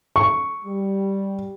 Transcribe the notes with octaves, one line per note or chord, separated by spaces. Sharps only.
C#6
G3